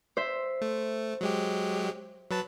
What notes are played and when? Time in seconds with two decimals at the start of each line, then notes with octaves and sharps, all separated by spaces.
0.17 C5 E5
0.62 A3
1.21 F#3 G#3 G4
2.31 F#3 B4 A5